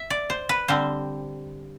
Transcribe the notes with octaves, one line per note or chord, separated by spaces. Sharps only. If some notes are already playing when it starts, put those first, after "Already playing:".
Already playing: E5
D5
C5
B4
D3 G3 C4 C5